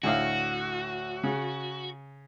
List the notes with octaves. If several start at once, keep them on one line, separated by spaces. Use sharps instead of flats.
D2 A2 F#4 F5
C#3